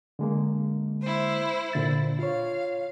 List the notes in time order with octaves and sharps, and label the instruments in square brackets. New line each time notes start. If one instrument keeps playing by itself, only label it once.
[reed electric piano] D3 G#3 A#3
[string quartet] E4 C5
[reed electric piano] A#2 D3 A6
[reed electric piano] F4 C#5 [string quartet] F5